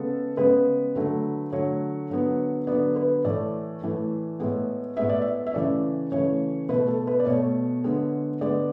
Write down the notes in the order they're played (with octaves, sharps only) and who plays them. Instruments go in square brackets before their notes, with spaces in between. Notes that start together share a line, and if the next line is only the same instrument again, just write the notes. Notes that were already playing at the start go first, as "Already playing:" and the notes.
Already playing: [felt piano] C#3 G#3 B3 A4
C#3 G#3 B3 B4
D3 F#3 A3
D3 F#3 A3 C#5
D3 F#3 B3
D3 F#3 B3 D5
B4
A2 E3 A3 D5
A2 E3 A3
A2 G#3 B3
A2 G#3 B3 E5
D5
E5
E5
C#3 E3 A3 D5
C#3 E3 A3 C#5
B2 A3 B4
A4
B4
D5
B2 A3 C#5
D3 G#3 B3
D3 G#3 B3 D5